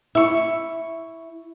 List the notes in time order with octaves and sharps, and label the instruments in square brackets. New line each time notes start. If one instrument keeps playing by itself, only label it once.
[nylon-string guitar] E4 [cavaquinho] E5 C#6